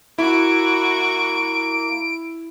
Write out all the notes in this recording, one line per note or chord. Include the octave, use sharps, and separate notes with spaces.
A#3 E4 F#4 C#6 D7